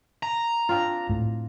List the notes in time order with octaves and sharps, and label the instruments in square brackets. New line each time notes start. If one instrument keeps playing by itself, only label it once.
[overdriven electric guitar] A#5
[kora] C4 D4 F4
[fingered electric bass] A2